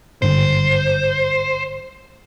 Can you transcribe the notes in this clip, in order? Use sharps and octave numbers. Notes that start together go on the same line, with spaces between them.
G#1 G2 D3 C5